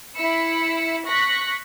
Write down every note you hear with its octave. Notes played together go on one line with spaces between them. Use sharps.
E4 B5 E6 C#7
C#6 F#6 A#6 B6